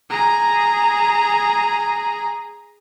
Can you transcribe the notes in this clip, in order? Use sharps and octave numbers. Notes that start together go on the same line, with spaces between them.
G#4 A#5